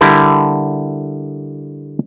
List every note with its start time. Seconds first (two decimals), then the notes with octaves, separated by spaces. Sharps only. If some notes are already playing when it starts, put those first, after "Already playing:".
0.01 D3 G3 E4 A#4